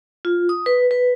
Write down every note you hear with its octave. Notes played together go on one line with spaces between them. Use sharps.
F4
D#6
B4
B4